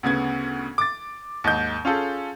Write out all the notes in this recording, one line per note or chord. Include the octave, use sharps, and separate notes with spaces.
D2 C#3 B3 G#6
D6 A6
D#2 G#2 D#4 G6
C#4 F4 G#4 A4